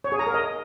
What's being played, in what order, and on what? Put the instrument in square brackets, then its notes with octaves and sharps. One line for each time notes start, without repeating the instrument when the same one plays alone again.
[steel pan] C#5
G#4
A#5
A#4
D#5